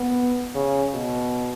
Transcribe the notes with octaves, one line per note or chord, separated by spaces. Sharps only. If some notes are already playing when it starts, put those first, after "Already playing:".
Already playing: B3
C#3
B2